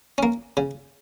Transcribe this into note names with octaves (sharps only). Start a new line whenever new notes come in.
A#3 C#4
C#3